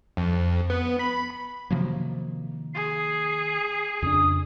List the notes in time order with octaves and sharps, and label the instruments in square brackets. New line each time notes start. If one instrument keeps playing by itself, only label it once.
[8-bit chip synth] F2
B3
B5
[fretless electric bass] C3 F3 F#3 [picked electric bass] D#3 A#3
[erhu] G#4 [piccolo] C7
[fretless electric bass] F2 [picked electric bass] C#3 D4 [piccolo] D#6